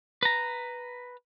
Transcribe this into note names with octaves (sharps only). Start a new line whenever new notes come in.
B4 A#5